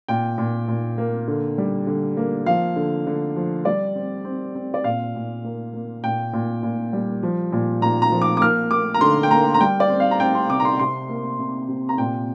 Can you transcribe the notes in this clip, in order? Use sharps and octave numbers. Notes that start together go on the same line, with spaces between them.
A#2 G5
A#2
A#2
A#3
D3
G3
D3
A#3
F3 F5
D3
D3
F3
G3 D5
C4
C4
C4
D5
A#2 F5
A#2
A#3
A#3
A#2 G5
A#2
A#2
G3
F3
A#2
A#2 A#5
A#5
F3
D6
D6
A#3 F6
A#3 D6
A#5
D3 C6
G5
A#3 A#5
A#5
G3 G5
D5
C4
F5
A#5
C4 G5
C6
C3 D6
A#5
C6
C3 C6
A#3
C3
C3
A#5
A#2 G5